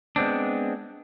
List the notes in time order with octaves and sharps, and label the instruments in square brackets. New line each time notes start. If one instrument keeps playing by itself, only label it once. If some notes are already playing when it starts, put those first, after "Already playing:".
[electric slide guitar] G#3 B3 C4 D4